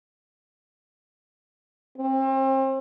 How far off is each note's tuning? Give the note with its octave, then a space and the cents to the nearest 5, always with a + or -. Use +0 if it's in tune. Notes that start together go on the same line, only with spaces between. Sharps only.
C4 +35